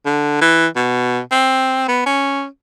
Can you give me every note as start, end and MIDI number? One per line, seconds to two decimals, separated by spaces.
0.05 0.38 50
0.41 0.67 52
0.76 1.20 47
1.32 1.83 60
1.88 2.02 59
2.06 2.45 61